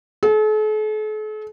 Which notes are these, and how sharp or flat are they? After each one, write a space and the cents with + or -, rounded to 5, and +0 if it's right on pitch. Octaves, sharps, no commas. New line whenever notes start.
A4 -45